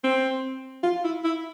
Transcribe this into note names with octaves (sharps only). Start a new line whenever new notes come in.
C4
F4
E4
E4